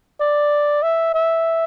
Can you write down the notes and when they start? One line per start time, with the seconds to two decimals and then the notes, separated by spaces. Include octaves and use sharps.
0.21 D5
0.83 E5
1.15 E5